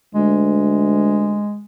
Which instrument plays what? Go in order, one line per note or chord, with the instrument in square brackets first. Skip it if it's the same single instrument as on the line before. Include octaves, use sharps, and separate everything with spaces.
[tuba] D2 [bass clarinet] G#3